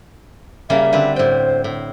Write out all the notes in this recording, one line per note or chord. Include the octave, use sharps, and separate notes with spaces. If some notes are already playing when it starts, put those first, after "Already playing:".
C#3 G3 A#3 E5
D3 C4 B4
A2 C5 G5
A2